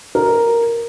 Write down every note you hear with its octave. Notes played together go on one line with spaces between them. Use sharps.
A#4